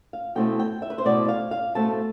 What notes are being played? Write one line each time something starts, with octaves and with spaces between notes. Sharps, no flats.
F5
B2 A3 C4 E4 G5
G5
E5
B4
C5
B2 A3 C4 E4 D5
F5
F5
B2 A3 C4 E4 A5